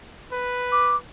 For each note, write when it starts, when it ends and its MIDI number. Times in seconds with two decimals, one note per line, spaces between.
0.32 0.99 71
0.72 0.96 86